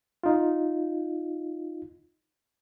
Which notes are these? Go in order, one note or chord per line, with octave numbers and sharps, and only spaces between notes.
D#4 F4